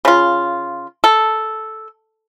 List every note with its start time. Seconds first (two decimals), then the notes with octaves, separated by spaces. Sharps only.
0.05 C#3 F4
1.04 A4